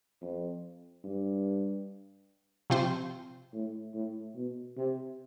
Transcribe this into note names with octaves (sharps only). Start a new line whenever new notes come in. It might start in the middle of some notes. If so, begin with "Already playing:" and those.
F2
G2
C3 F3 C4 F4 C5
A2
A2
B2
C3